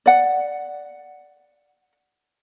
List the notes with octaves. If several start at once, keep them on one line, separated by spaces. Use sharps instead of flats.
D5 F#5